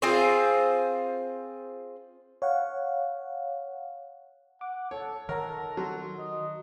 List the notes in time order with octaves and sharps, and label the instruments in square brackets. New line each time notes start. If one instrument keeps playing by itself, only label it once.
[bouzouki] C4 F4 G#4 C5
[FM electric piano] C#5 F5 F#5
[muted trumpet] F#5 [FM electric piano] D6
[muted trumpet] A4 [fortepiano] C#5
[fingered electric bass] D#3 [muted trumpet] A4 [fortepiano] A#4 [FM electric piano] C#5 F#5 A#5
[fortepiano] F#3 [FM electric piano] F#4 C6
[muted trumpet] D#5